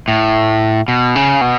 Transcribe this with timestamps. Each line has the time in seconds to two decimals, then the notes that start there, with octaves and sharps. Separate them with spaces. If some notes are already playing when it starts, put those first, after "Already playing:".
0.08 A2
0.88 B2
1.16 C#3
1.41 B2